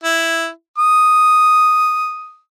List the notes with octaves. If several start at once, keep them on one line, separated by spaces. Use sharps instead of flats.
E4
D#6